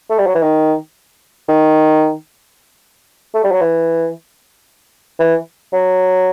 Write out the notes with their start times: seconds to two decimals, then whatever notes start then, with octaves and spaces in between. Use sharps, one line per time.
0.10 A3
0.19 G3
0.27 F#3
0.35 E3
0.42 D#3
1.49 D#3
3.34 A3
3.44 G3
3.52 F#3
3.61 E3
5.19 E3
5.73 F#3